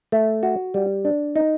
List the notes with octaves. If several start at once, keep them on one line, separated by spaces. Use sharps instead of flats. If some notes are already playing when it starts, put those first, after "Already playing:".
A3
F#4
G3
D4
D#4